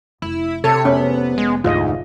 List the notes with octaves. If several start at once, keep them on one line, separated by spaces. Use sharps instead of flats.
F1 E4
C3 A4 C#5
F1 B3 C#4
G#3
D2 G#2 F4 D#5